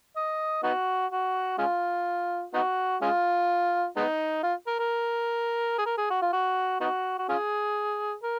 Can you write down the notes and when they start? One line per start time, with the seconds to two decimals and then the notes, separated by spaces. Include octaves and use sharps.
0.16 D#5
0.63 B3 D#4 F#4
1.11 F#4
1.58 G#3 C#4 F4
2.54 B3 D#4 F#4
3.01 G#3 C#4 F4
3.97 G#3 B3 D#4
4.43 F4
4.67 A#4
4.79 A#4
5.78 G#4
5.85 A#4
5.97 G#4
6.10 F#4
6.22 F4
6.33 F#4
6.80 B3 D#4 F#4
7.19 F#4
7.29 C#4 F4 G#4
8.23 A#4